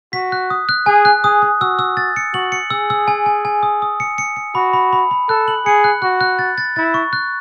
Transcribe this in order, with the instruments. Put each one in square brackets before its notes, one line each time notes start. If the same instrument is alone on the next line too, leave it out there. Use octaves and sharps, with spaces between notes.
[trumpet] F#4 [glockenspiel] B6
[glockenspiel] F#6
D#6
F#6
[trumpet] G#4 [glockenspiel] G#5
[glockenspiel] F#6
[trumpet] G#4 [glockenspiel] D#6
[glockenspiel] D#6
[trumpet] F#4 [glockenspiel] E6
[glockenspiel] E6
A6
C#7
[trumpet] F#4 [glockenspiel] F#7
[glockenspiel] C#7
[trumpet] G#4 [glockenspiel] E6
[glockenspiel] E6
G#5
G#5
G#5
D#6
D#6
C#7
C#7
C#7
[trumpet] F#4 [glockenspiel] B5
[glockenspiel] B5
B5
B5
[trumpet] A4 [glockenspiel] F#6
[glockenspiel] F#7
[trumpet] G#4 [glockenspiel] C#7
[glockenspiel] F#6
[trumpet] F#4 [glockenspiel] F#6
[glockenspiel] F#6
A6
A6
[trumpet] E4 [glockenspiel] A6
[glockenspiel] C#6
F#6